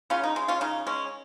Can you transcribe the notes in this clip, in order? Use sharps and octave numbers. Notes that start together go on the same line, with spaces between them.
C#3 C#4 F4
D#4
G#3
C#4 F4
C#3 D#4
G#3 C#4